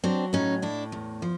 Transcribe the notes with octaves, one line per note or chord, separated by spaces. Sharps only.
F#3 C4 D4
A2 C#4 D#4
A2 D4 E4
E2
F3